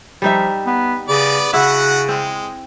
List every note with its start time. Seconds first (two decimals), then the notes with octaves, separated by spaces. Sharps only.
0.22 F3 G3 D#4 E5
0.66 B3
1.09 C#3 B3 D5
1.53 C#3 E4 F#4 E5 F#5
2.08 G#3 C4